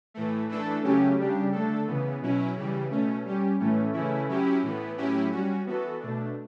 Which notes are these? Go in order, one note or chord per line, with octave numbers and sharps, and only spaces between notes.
A2 E3 A3
E3 A3 D4 A4
C#3 F#3 A3 C#4 G4
C#3 G3 D4 G4
D3 A3 D4 A4
C#3 E3 B3
B2 F#3 C#4 E4
C#3 E3 G3
B2 A3 C#4
G3 C#4 G4
A2 E3 A3 C#4
C#3 E3 A3 C#4 E4
F#3 C#4 E4 G4
A2 E3 B3
A2 F#3 C#4 E4 G4
G3 C#4 F#4
E3 B3 F#4 A4
B2 A3 D4